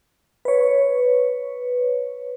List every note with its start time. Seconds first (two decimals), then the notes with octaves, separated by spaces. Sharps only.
0.45 B4 C#5